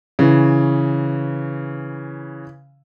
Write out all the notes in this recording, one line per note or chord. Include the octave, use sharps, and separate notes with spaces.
C#3 E3